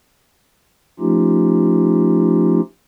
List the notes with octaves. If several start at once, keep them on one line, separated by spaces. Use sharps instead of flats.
F3 A3 C#4 D#4 F4 G4